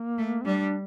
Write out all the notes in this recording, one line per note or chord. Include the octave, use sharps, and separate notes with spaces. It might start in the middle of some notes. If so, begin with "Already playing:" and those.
Already playing: A#3
A3
C4
G3 D4